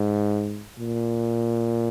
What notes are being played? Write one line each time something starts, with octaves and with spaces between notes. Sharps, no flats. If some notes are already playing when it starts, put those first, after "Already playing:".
Already playing: G#2
A#2